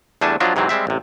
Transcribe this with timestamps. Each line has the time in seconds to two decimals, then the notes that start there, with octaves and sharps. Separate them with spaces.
0.21 E2 G3 A3 D4 G#5 A5
0.40 F3 F#3 D4 F4 D#5
0.56 G#2 C3 E3 F#3 C4
0.69 G3 G#3 C4 E5
0.87 A1 C3